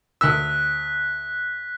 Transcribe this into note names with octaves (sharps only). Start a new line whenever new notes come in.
D2 E6 F#6 B6